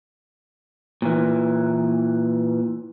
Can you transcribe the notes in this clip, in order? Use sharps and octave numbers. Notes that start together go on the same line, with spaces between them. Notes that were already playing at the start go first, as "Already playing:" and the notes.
A#2 E3